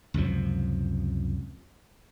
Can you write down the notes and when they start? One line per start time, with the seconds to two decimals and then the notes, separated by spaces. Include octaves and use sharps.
0.14 C#2 F#2 C3 F3